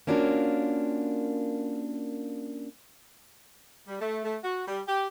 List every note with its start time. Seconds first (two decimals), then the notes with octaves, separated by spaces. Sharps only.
0.07 A#3 C#4 D4 F4 F#4 A#4
3.87 G3
4.00 A3
4.25 A3
4.44 F#4
4.68 G3
4.88 G4